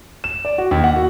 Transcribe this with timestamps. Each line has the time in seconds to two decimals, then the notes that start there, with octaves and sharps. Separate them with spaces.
0.24 E7
0.45 D5
0.58 F#4
0.71 D#2
0.84 F#5
0.96 F#4